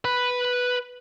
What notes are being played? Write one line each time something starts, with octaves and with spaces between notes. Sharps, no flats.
B4 B5